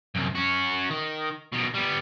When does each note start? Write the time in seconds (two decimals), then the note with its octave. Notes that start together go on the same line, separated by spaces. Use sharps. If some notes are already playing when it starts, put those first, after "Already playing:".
0.15 C2 F#2
0.35 C#4 F#4
0.90 D#3
1.53 B2 D#3
1.75 G3 B3